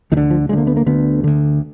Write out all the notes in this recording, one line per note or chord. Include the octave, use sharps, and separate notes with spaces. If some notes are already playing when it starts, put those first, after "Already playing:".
D2 D#3
D3
F3
D2 D3 G#3 A#3
B3
A#3
D2 D3 B3
D2 D3